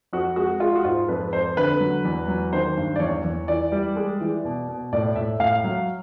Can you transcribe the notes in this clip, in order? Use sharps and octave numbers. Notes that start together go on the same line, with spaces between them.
F2 F#4
G#3 F#4
G#3 F4
F#4
G#2 F4
F2 B4
F2 C5
D3 B4
F#3
E2
F#3
D#3 C5
G2
D5
E2 C#5
E2
E3 D5
G3
G#3
E3
B2
B2
A2 D5
A2 E5
A2 F5
F#3